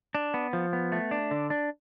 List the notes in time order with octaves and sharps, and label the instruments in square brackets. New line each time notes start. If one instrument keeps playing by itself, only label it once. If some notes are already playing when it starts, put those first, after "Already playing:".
[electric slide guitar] D4
B3
F3
B3
A3
D4
D3
D4